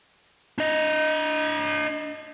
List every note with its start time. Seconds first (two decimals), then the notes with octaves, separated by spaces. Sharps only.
0.58 D4 D#5